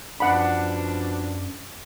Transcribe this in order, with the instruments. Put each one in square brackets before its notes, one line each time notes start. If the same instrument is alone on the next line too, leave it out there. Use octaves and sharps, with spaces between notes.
[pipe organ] F#2 [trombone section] B2 F3 D4 [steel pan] F#5 B5